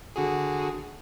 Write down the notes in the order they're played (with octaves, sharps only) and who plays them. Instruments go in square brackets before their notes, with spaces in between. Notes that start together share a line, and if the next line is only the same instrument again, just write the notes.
[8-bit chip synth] D3 F#4 G#4